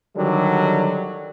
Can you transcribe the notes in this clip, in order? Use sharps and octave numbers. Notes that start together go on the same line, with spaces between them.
D3 D#3 F#3 G3